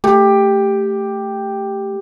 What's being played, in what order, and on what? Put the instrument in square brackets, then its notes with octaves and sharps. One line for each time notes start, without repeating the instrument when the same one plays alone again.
[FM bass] A3 [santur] G4